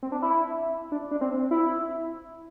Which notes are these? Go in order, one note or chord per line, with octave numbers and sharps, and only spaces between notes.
C4
D4
E4
D4
D4
C4
E4